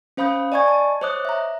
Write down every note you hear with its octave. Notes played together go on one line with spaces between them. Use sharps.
C#4 C5 F5 B5 D#6 G6
D5 D#5 G#5 C#6 G#6
A5
C5 C#5 D#5 D6 D#6 F#6
E5 A#5